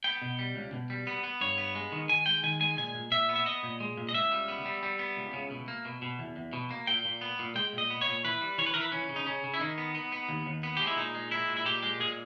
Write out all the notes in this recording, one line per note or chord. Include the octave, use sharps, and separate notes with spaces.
B3 G5
B2
G3
C#2
B2
G3
B3
B3
G2 C#5
B3
G#3
D#3
D#3 G#5
G#3 G5
D#3 G#5
G#3 G#5
A#2 G#5
A#2
A#2 E5
B3
E5
B3 D#5
A#2
G#3
A#2
D#5
C#2 E5
G3
B3
G3
G3
B3
C#2
C#3
B2
A#3
B2
B2
E2
E2
B2
A#3
A#2 G5
A#2
B3
A#2
G#3 G5
A#2
D#5
B3
C#5
A#2
E3 B4
G3
E3 C#5
B4
E3 A#4
B4
E3 C#4
C#3
D#4
C#3 C#4
C#3
E4
D#3 D#4
B3
B3
B3
D#2
D#2
B3
G#3 G4
E4
A#2 D#4
G#3
G#3 E4
A#2
E4
A#2 G4
G#3 G4
A#2 G#4